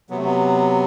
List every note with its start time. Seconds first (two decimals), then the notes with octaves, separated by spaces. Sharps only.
0.10 C3 F#3 B3
0.17 A3
0.24 B3